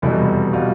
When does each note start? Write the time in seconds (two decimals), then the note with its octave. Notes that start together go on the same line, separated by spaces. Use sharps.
0.02 F1 E2 B2 G3 E4
0.53 B2 G3 F4